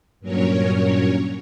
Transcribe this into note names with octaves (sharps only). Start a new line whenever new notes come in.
G2 A#2 F#3 C#4 A#4 C#5